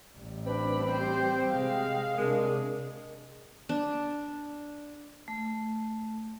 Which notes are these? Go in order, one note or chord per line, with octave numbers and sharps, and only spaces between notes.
A1 G3
C4 D4 B4 B5
G4 C5 G5
C3 G#3 F5
C3 G#3 D4 G#4 A#4
D4
A3